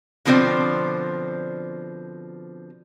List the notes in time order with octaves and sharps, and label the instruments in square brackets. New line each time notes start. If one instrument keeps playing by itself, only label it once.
[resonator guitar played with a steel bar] B2 D3 F3 C4 C5 D5